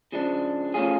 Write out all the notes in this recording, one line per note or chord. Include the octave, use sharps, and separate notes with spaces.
C#3 F3 G#3 D4
F3 A3 C#4 F4 G#4